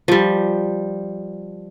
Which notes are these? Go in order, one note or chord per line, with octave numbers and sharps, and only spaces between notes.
F3 G3